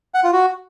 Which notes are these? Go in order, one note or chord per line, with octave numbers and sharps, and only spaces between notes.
F#5
F4
F#4